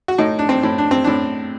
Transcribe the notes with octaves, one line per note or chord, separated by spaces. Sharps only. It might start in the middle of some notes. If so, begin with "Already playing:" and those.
F#4
A2 D#4
D4
C4
A2
D4
C4
A2 D4